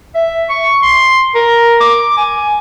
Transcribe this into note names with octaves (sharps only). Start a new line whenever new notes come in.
E5
C#6
C6
A#4
D6
G#5